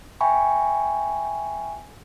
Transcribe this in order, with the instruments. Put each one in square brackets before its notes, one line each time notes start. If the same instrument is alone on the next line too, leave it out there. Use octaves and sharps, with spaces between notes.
[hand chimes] E5 G5 G#5 B5 C#6